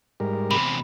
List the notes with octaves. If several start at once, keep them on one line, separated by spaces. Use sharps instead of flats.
G#2 G3 A#4
E2 C3 B5